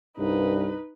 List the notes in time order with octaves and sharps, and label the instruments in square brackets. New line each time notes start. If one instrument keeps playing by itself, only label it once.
[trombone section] C2 G2 [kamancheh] D#4 B4